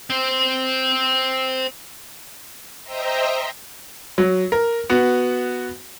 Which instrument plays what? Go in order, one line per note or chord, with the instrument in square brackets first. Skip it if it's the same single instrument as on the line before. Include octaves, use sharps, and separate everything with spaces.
[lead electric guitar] C4 C5
[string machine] C5 D#5 E5 G5 A#5
[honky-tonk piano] F#3
A#4
B3 F#4